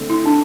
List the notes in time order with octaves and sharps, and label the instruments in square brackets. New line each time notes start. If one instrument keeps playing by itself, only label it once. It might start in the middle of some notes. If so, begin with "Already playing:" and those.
Already playing: [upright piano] D3 A3 C4
[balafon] E4
D4